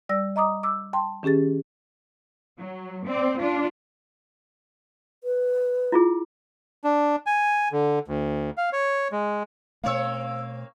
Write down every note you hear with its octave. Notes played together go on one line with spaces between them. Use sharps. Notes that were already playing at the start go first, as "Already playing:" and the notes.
G3 D5 E6 A#6
D#5 A#5 D6 D#6
D6 E6
G5 A5 C6
D#3 C#4 G4 G#4 A6
F#3
C4 D5
D4 F4
B4
E4 F4 G#4
D4
G#5
D3
D2
F5
C#5
G#3
B2 A3 A#3 C4 C#5 F5 E6